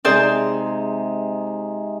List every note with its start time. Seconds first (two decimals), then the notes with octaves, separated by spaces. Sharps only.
0.05 C3 G#3 D#4 G#4 C5 D5